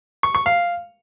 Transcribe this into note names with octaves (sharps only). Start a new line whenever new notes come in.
C#6
C#6
F5